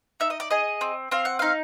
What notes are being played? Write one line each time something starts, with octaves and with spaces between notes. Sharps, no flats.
D#4 E5
D#5
D5
G#4 D#5
C4
C4 F5
F#5
D#4 F5